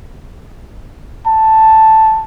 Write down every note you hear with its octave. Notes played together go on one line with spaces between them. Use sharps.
A5